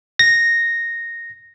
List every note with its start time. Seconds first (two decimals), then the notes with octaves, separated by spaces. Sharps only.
0.19 A#6